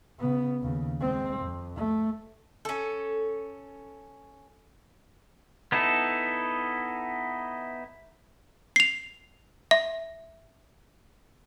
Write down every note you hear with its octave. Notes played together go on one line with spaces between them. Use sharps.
C#3 B3
D#2 C#3
G#3 C4
F2
A3
C#4 A4
B3 D#4 E4 A4
C7 F7
E5